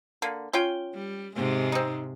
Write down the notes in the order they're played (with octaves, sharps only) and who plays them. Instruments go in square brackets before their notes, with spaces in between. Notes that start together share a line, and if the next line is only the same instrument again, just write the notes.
[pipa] D3 A#3
C#4 F4 G5
[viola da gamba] G3
G#2 C3 G#3
[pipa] C4 D#4